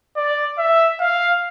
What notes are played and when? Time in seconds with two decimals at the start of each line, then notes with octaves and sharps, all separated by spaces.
0.17 D5
0.58 E5
1.00 F5